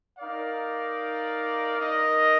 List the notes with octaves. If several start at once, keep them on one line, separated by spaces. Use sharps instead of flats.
D#4 A#4 D5 F5
D#4 A#4 D#5